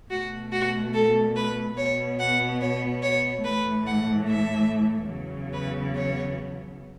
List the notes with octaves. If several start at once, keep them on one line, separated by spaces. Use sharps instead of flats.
B2 A3 F#4
F#4
A4
B4
B2 B3 C#5
F#5
C#5
C#5
A2 E3 A3 B4
F#5
E5
E2 C#3 F#3 B3
B4
C#5